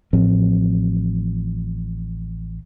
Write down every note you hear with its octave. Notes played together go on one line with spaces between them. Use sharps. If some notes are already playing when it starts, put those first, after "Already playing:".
A1 A2 F3 C4